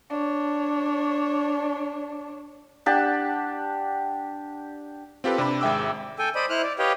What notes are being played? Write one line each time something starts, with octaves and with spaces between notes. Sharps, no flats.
D4 C#5
D4 G4 F#5 A5
C4 F4 G4 A4 B4
C3 D4 G4 B5
G#1 G#3 E5 G5 D6 E6
A4 G5 G#5
C5 D5 D#5 B5
E4 C5 F6 F#6
D5
G4 B4 C#5 D#5 F5 G5